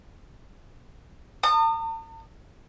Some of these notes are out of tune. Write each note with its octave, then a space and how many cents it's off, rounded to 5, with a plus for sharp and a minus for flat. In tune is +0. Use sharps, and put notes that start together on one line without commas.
A5 +45 D#6 -30